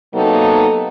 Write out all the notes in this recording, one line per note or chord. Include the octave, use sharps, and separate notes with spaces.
C3 F#3 A#3 B3 D#4 A4